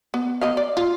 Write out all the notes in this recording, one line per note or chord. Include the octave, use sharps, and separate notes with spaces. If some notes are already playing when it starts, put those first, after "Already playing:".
B3
B3 D#5 F5
D5
F4